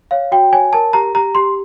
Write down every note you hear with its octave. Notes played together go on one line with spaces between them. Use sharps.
C#5 F5
F#4 G5
C#5 G#5
A#4 A5
G4 A#5
G4 A#5
G4 C6